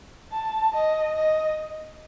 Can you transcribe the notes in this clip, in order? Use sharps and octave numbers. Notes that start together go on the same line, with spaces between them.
A5
D#5
D#5